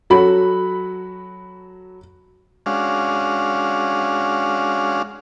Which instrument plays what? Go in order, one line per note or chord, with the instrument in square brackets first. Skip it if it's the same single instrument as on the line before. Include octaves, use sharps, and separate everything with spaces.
[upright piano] F#3 F#4 A4 B5
[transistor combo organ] G#3 C#4 D4 F#4 F5